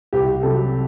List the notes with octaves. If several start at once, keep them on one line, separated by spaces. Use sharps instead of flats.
C2 G4
C3 F#3 A4